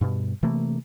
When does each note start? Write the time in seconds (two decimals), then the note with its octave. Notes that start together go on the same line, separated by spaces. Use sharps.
0.01 G2 B2
0.43 C3 E3 A3 A#3